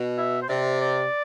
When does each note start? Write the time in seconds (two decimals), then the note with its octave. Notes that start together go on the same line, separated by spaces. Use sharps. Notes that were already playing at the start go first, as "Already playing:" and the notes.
Already playing: B2
0.18 E5
0.42 C5
0.49 C3 D5
0.80 D5